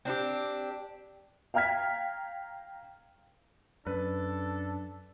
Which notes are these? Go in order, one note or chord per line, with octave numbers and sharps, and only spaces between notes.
C4 D4 E4 G4
F5 G5 A#5 F6 G#6 B6
F#2 D4 A4 B4